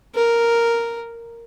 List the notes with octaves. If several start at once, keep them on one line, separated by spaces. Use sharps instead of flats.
A#4